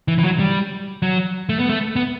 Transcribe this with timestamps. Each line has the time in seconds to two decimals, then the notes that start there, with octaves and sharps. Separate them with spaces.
0.08 E3
0.19 E3
0.24 F#3
0.39 G3
1.02 F#3
1.49 A3
1.59 B3
1.69 A3
1.96 B3